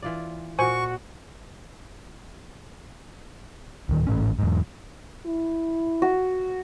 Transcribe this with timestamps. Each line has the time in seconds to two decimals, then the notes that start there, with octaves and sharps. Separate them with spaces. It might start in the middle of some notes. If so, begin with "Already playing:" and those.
0.02 E3 F4 D5
0.59 A#2 F#4 C5 G#5 C#6
3.89 D1 D#3
4.07 G#1 A2 C#4
4.39 E2 G#2
5.26 E4
6.02 F#4